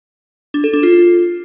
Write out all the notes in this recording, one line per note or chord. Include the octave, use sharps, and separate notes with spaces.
D4
A4
D4
F4